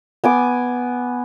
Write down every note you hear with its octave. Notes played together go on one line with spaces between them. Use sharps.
B3 G#5 D6